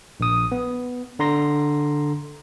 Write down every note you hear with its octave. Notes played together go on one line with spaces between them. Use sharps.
A#1 D#6
B3
D3 A#5 C6 A#6